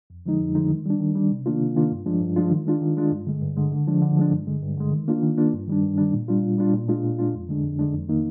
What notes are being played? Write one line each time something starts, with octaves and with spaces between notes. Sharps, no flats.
F2
D3 F3 G#3 D#4
F2
D3 F3 G#3 D#4
D#3
G3 D4
D#3
G3 D4
C3
D#3 A#3 D4 F4
C3
D#3 A#3 D4 F4
G2
F3 G#3 D4 F4
G2
F3 G#3 D4 F4
D#3
G#3 D4 F4
D#3
G#3 D4 F4
G2
D3 G#3
G2
D3 G#3
D3
F3 G#3 D4
D3
F3 G#3 D4
G2
D3 G#3
G2
D3 G#3
D#3
A#3 D4 F4
D#3
A#3 D4 F4
G2
D#3 G3 D4
G2
D#3 G3 D4
A#2
G3 D4 F4
A#2
G3 D4 F4
A#2
G#3 D4 F4
A#2
G#3 D4 F4
F2
D3 G#3 D4
F2
D3 G#3 D4
F2
D#3 A#3 D#4